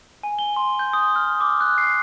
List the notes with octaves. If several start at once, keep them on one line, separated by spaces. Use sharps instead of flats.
G#5
G7
C6
G6
D#6
F6
D6
F#6
C7